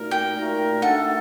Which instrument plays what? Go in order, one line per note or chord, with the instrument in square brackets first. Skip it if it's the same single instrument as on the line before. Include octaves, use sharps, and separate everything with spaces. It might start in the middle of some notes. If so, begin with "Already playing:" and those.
Already playing: [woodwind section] A#2 A3 D#4 F#4 A#4
[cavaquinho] G5
[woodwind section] A#2 A3 D#4 F#4 A#4
[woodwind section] A3 D4 A4 [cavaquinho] F#5